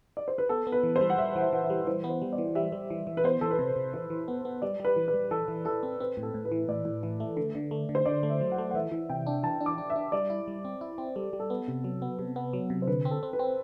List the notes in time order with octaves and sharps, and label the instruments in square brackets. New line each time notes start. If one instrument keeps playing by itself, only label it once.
[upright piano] D5
C5
B4
[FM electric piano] B3 [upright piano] A4
[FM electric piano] B3
[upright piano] B4
[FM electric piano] E3
[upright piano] C5
[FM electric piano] G3
[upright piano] F#5
[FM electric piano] G3 [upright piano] E5
[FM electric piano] E3 [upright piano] F#5
[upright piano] E5
[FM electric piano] E3 [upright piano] F#5
[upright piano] E5
[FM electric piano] G3
[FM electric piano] E3 [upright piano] C5
[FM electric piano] B3
[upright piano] C5
[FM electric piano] G3
[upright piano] D5
[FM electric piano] E3
[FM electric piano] G3 [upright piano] E5
[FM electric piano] G3
E3
E3
[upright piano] B4
[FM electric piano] B3 [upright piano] C5
[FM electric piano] E3 [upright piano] A4
[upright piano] B4
[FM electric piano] C3 [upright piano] A4
[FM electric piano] C3
[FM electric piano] E3 [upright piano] C5
[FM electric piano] E3
B3
B3
[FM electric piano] G3 [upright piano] D5
[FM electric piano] G3 [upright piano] B4
[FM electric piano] E3
[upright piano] B4
[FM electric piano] G3
[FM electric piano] E3 [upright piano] A4
[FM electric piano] E3
[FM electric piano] E4 [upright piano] A4
[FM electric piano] C4
[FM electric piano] C4 [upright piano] B4
[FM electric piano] A2
[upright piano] A4
[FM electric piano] A2
[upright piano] B4
[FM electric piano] E3
[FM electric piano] A2 [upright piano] D5
[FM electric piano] A2
E3
A3
D3
D3
A3
D3
[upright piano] C5
[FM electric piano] D3 [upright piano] D5
[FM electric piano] A3
[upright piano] E5
[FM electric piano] F#3
[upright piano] F#5
[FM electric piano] A3
[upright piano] F#5
[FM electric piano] E3 [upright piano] E5
[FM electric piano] E3
[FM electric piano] C3 [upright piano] G5
[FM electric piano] D4
[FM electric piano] E3 [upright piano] A5
[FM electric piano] D4
[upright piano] D6
[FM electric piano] D4
[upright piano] E5
[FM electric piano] D4
[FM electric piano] G3 [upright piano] D5
[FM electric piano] E4
G3
C4
E4
C4
[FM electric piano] G3 [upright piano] A4
[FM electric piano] G3
[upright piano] A4
[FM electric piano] B3
C3
F#3
B3
C3
B3
F#3
C3
[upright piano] C5
[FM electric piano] D3 [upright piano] B4
[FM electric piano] C4
[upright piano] A4
[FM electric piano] C4
[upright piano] B4
[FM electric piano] C4